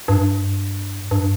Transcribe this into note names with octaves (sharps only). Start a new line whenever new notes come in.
G2
G2